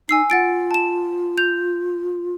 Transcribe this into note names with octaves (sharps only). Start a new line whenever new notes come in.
D#4 G#5 E6 C7
F4 F#5 A6 D7
A5 E7
G6 F7